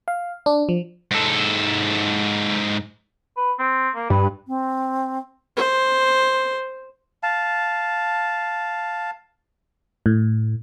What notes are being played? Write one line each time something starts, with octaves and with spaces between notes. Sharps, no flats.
F5
D4
F3
G#2 A4
B4
C4
A#3
G2 B4
C4
C5
F5 A5
A2